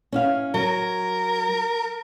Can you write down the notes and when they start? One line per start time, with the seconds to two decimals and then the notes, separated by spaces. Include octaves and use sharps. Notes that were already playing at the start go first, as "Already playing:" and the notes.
0.12 C#4 E4 F5
0.54 F#3 A#4